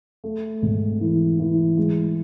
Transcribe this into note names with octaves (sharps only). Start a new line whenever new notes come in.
A3
G#1
E3
E3
G#3